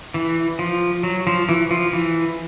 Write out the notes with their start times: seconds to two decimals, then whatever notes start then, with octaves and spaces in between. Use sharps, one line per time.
0.14 E3
0.59 F3
1.03 F#3
1.27 F3
1.49 E3
1.71 F3
1.93 E3